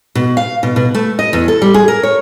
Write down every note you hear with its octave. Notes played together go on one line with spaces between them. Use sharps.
B2
F5
B2
B2
A3
D#5
E2
A4
G3
G#4
A#4
C#5